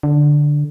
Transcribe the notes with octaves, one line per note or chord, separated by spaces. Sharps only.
D3